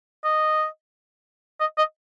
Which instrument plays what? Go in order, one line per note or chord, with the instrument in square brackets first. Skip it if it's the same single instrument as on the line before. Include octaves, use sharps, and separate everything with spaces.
[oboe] D#5
D#5
D#5